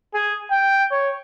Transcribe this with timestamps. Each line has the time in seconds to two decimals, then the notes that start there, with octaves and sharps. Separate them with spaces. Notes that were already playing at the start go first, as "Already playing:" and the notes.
0.14 G#4
0.51 G5
0.91 C#5